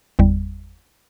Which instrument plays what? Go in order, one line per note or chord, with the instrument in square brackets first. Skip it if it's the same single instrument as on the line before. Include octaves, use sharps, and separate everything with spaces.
[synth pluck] G1 E2 G3